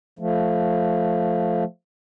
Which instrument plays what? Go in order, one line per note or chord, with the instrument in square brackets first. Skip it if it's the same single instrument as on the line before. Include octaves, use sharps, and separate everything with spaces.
[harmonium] F3 A3